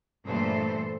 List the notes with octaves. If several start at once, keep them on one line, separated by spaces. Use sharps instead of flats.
G2 A#2 E3 A3 A4 C5